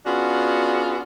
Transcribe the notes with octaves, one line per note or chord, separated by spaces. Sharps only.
B3 C#4 D4 F4 F#4 G#4